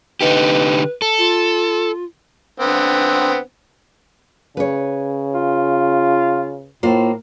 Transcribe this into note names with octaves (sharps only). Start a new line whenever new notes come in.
D3 D#4 G4 B4
A4
F4
D3 B3 C4
C#3 B4 C#5
F4
A2 A#3 F4 C5